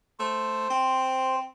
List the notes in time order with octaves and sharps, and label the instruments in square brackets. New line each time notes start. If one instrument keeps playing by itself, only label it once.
[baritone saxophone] A3 [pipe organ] C5
[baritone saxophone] C4